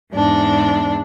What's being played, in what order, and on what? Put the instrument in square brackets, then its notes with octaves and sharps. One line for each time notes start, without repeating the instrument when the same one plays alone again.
[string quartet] E2 G#2 D4